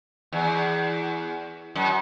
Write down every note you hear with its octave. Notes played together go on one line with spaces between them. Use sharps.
E2
F#2